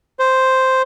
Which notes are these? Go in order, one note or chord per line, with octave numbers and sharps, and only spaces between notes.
C5